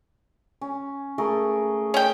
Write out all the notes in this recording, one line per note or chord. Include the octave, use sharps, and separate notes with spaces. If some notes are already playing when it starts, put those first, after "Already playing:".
C#4
A3 G#4 A#4
C#4 G5